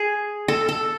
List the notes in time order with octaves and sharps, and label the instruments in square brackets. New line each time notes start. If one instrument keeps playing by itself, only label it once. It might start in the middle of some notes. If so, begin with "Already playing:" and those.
Already playing: [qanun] G#4
A4
A4